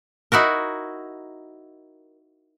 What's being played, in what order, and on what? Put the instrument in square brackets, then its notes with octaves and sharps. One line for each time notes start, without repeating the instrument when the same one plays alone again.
[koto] D#4 E4 F#4 A#4